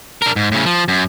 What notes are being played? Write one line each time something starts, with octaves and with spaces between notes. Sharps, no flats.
D4 A#4
G#2
A2 C#3
F3
F#2